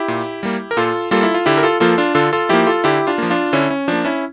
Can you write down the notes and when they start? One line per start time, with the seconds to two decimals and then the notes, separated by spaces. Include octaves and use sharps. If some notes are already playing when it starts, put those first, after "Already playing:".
Already playing: E4 G4
0.08 A#2
0.43 G3 A#3
0.71 A#4
0.77 A#2 F4 A4
1.11 G3 A#3 F4 A4
1.23 E4
1.34 F4
1.46 D3 E4 G4
1.57 A#4
1.63 F4 A4
1.80 F3 A#3 F4 A4
1.98 D4 F4
2.15 D3 F4 A4
2.33 F4 A4
2.49 F3 A#3 E4 G4
2.67 F4 A4
2.84 D3 E4 G4
3.07 D4 F4
3.18 F3 A#3
3.30 D4 F4
3.53 D3 C#4 E4
3.70 C#4
3.88 F3 A#3 D4
4.05 C#4 E4